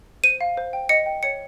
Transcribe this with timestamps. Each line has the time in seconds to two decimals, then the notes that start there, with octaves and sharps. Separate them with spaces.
0.24 C5 D#7
0.41 F5
0.57 C5
0.73 G5
0.89 D#5 C#7
1.06 G5
1.23 C#5 C#7